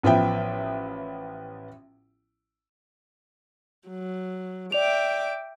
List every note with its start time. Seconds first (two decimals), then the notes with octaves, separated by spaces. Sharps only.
0.03 A1 F3 B3 E5 G5
3.87 F#3
4.72 D5 E5 G5 D6 F7